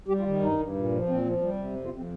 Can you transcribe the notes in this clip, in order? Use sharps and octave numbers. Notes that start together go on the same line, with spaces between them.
G3 G4
F4
D#3
G2 D#4
G2
A#2
F3
A#2 C4
F3
G3
C3
F2
F4
F2
C4